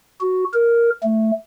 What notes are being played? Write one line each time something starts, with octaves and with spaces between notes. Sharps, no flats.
F#4
A#4
A3